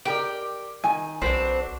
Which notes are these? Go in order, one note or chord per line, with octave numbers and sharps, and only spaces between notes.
G4 A#4 D5 G5
D#3 G#5
B1 F#3 C4 D4 F#4 B4